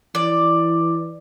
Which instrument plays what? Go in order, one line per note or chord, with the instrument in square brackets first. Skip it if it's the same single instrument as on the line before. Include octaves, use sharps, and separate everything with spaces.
[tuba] E3 [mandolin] D5